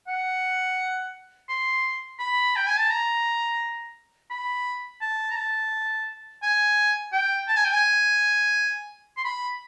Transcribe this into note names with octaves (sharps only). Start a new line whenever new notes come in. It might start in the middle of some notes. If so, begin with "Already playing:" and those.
F#5
C6
B5
G5
G#5
A5
A#5
B5
A5
A#5
A5
G#5
G5
A5
G#5
G5
G#5
C6
B5